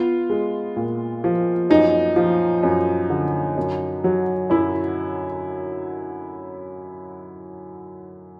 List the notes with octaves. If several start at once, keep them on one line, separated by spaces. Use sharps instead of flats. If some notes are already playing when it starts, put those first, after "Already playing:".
Already playing: B3 F4
G#3
A#2
F3
F#2 D#4
F3
F#2
D3
F#2
F#3
F#2 E4